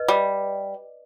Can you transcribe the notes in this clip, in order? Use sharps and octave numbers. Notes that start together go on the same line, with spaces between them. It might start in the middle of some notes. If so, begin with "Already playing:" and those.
Already playing: B4 D#5
G3